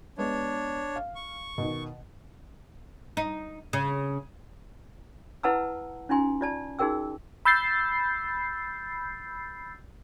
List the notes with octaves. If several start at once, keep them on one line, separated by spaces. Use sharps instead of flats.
G#3 B3 D4 C#5
F5
C#6
B2 D#3
D#4
C#3
E4 B4 F#5 A5 A#5 E6
C#4 D#4 F4 G#5 C6
F4 D5 A5
D#4 F#4 G#4 A#4 G5 E6
B5 E6 G6 A6 C7